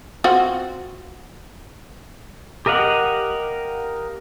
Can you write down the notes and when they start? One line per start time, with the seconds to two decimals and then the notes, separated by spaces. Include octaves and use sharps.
0.24 C4 F4 F#4
2.66 G4 A#4 D#5 F5 F#5